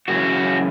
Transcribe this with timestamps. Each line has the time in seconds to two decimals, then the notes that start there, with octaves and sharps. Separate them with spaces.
0.08 F#2 C#3 E3 F#4